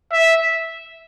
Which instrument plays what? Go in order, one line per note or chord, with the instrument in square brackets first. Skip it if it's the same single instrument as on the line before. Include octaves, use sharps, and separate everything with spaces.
[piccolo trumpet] E5